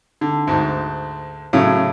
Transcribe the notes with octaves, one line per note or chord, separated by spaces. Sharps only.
D3
D2 G#2
A2 C#3 F#3